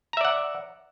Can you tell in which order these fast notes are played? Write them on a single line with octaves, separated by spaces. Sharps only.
A#5 E5 D5 F#5